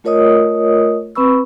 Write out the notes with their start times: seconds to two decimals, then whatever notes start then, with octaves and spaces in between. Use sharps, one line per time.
0.04 A3 F4 A#4 C#5 D#5 D#6
1.15 C4 B4 B5 C#6 E6